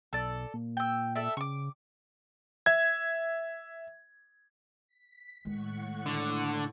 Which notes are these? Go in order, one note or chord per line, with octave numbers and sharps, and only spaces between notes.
B1 A4 D5
A#2
G5 E6
A4 D5 E5
C#3 C#6 D6
E5 G#6
B6
A2 D#3 G#3 F#5 C#6
D3